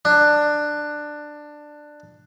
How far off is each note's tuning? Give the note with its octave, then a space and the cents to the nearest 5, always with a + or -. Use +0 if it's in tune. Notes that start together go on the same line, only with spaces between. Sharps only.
D4 +15